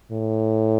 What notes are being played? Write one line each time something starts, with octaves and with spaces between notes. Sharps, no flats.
A2